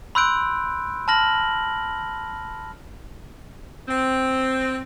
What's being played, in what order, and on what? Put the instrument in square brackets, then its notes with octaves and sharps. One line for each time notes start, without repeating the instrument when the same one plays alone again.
[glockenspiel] B5 C6 E6 F#6 G6 D7
A5 B5 F6 A#6 F#7
[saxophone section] C4